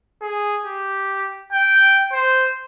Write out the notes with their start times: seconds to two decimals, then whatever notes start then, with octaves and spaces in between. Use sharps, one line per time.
0.22 G#4
0.65 G4
1.52 G5
2.12 C5